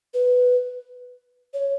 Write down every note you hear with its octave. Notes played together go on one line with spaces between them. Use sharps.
B4
C#5